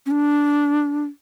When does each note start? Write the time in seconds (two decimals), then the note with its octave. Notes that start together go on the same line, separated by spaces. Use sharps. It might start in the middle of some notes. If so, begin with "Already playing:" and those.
0.06 C#4
0.11 D4